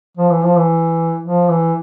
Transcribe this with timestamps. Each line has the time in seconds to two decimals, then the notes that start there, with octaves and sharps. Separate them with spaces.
0.17 F3
0.30 E3
0.43 F3
0.57 E3
1.23 F3
1.49 E3